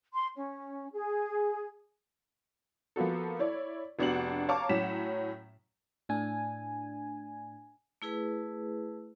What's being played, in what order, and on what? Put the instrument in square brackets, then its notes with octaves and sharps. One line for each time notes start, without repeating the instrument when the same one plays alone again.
[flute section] C6
C#4
G#4
[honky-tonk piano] F3 A#3 B3 F#4 A4
E4 C#5 D5
F1 B3 D4 F#4 F#5 F#7
C#5 F5 A5 A#5 C#6 D6
A2 F#3 C#4 F#5 B6 E7
[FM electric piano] A2 D4 G#5
[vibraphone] A3 E4 G#4 B4